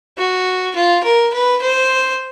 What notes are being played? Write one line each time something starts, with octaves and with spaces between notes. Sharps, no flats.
F#4
F4
A#4
B4
C5